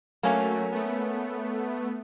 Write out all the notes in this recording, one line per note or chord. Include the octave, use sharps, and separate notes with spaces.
F#3 A3 A#3 C#4
A3 B3